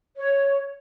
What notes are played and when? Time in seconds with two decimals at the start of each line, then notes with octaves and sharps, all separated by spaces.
0.17 C#5